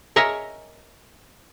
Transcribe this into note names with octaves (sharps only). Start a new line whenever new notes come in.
A#4 C#5 D#5 E5 G#5